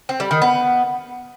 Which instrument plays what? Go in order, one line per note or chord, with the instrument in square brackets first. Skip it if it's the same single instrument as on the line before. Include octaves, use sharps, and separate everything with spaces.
[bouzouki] C4
G3
D#3
B3